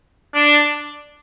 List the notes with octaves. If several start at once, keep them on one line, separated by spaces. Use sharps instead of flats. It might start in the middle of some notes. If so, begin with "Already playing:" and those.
D4